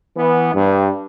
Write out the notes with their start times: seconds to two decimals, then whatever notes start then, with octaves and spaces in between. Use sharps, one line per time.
0.16 E3 B3
0.54 G2